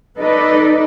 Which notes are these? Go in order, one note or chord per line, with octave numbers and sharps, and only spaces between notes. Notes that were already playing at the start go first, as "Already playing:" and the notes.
D#4 A4 B4 D5